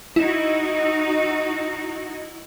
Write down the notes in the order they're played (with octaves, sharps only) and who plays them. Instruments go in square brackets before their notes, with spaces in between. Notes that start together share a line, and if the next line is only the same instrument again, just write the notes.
[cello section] D#4 F#4 [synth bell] E4